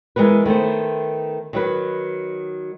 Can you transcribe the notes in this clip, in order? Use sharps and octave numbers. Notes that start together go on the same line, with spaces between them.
E3 G#3 B3 A#4 B4
D#3 A3 B3 C5
D#3 F#3 B4